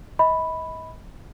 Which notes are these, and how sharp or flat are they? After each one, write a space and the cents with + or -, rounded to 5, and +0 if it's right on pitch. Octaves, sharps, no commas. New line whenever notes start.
D#5 +40 B5 +0